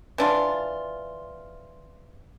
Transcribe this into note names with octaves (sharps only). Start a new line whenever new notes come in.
E3 D4 F4